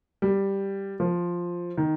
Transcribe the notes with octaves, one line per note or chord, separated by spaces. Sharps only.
G3
F3
D#3